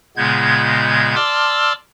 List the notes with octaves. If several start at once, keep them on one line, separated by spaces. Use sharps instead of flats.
A#2 C#3 G#3 B3 G6 G#6
D5 A5 C6 D6 E6 F6